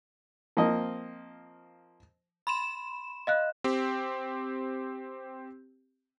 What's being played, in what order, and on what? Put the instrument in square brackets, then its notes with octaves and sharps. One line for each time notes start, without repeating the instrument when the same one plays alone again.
[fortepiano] F3 A#3 C4 D#5
[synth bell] B5 C6 E7
[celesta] D#5 F5 F#6
[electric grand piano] C4 G4